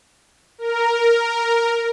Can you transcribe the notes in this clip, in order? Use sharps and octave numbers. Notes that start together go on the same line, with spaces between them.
A#4